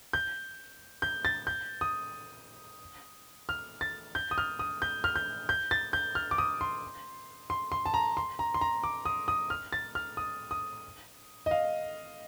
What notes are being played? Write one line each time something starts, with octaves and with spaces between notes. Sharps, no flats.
G6
G6
A6
G6
D#6
F6
A6
G6
D#6
F6
D#6
G6
F6
G6
G6
A6
G6
F6
D6
D#6
C6
C6
C6
A5
A#5
C6
A#5
C6
A#5
D6
D#6
D#6
F6
A6
F6
D#6
D#6
D#5
F5